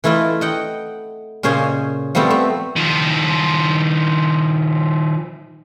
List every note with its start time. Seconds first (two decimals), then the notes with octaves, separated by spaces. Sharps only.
0.04 E3 A3 E4 F4 D#5
0.41 D#5 F#5 G5
1.43 A#2 C#3 C#4 C5 D#5 G#5
2.15 F3 G3 A3 B3 C4
2.30 A3
2.76 D#3 F3